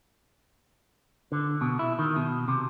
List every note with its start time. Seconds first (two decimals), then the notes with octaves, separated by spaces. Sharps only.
1.32 D3
1.61 B2
1.79 E4
1.99 D#3
2.16 B2
2.48 C3